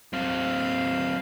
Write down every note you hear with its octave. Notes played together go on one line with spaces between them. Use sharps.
F#3 C4 F5